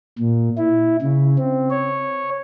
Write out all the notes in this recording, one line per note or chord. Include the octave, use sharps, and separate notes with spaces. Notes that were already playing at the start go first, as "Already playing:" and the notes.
A#2
E4
C#3
C4
C#5